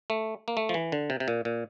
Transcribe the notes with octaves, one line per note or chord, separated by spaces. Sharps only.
A3
A#3
A3
F3
E3
D3
C3
C3
A#2
A#2